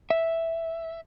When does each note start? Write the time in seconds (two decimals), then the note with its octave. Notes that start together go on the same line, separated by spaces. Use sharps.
0.10 E5